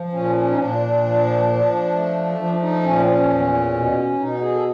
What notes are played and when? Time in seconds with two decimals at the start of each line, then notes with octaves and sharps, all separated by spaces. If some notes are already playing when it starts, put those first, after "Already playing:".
Already playing: F3
0.12 A#2 C#4
0.36 C#4
0.50 D#4
0.57 A#2 D4
1.03 F3
1.49 F3
1.93 A3
2.38 F3 D4
2.55 D4
2.61 D#4
2.83 A#2 C#4
2.99 C4
3.05 C#4
3.29 E2
3.74 B2
4.19 B2 D#4
4.41 G#4
4.54 A4